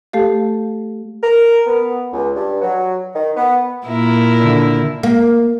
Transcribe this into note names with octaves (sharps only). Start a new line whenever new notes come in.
A3 G4 A4 F5
A#4
B3
C#2
G2
F#3
D#3
B3
A#2 E4 A#4
D3
A#3